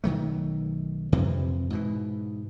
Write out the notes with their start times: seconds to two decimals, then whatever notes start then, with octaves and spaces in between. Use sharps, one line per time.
0.04 B1 D#3 F#3 A3
1.12 F2 C3 E3 F3
1.70 G#2 B2 E3